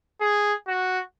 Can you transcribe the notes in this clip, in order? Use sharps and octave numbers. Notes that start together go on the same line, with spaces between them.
G#4
F#4